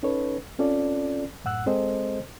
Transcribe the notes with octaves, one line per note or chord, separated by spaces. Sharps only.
C#4 D#4 A4 B4 C#5
C4 C#4 F4 A4 D5
F#2 A2 F#5 E6 F#6
G#3 C4 G#4 A4 C5 D#5